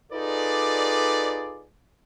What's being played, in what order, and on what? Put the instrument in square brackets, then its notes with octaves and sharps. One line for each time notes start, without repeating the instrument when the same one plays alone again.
[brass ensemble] D#4 F4 G#4 A4 B4 D5